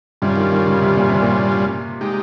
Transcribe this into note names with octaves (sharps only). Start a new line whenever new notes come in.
G2 C3 G3 C#4 F4
D#3
D#3
C#3
C3
A#2
C3
A#2
G#3 D#4 G4